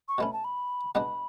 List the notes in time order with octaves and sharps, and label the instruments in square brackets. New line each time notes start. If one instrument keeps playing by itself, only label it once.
[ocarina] C#6
[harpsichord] B2 A3 C#4 [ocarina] B5
[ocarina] A5
B5
[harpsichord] B2 G#3 B3 D4 F#4 [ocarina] B5